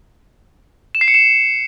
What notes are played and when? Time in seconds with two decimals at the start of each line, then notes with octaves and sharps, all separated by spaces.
0.95 E7
1.01 C7
1.08 C#7
1.14 E7